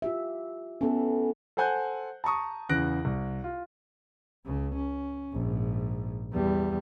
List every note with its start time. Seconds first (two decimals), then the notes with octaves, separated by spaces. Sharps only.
0.02 F4 G4 E5
0.81 E3 A3 B3 C#4
1.57 A4 C5 F#5 G#5 F#6 G6
2.24 A5 A#5 C#6 D#6
2.69 E2 C#3 F#6 A#6 D7
3.05 C2
3.44 F4
4.46 C#2 C#3
4.76 C#4
5.33 A#1 G#2
6.32 E2 G3